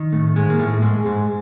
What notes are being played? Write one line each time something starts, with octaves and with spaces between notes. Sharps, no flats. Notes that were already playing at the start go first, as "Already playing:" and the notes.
Already playing: D#3
A2 A3
G#2 G#3
A#3
A2 A3
G#2 G#3
G#2 G#3